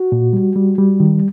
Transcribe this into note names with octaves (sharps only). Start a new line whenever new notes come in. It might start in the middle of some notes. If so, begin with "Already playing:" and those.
Already playing: F#4
A#2
G3
G3
G3
D#3